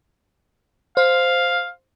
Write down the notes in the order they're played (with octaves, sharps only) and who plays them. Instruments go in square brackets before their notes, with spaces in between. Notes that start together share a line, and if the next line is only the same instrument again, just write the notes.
[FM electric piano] C5 [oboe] F5